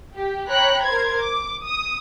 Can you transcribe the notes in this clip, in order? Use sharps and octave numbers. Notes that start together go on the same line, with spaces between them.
G4
C#5 G5 A#5 B5 F#6
A#4 C5 G#6
D6
D#6